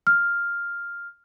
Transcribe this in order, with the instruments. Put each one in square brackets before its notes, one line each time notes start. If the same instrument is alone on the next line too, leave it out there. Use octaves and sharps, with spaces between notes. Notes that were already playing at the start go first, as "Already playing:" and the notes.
[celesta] F6